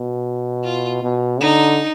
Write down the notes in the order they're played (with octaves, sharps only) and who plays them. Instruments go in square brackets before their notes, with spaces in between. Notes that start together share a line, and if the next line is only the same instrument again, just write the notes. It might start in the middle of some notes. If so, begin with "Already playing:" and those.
Already playing: [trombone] B2
[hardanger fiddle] F4
[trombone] B2
[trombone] D3 [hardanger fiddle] D#4